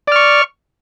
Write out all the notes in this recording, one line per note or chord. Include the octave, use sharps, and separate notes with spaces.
D5 C#6 F6